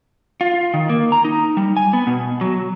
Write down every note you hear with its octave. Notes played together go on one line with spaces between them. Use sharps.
F4
D#3
A#3
A#5
D#4
G3
G#5
B3
B2
F#3